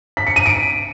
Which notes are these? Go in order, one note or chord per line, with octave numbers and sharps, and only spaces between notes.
B6
C#7
D#7
D7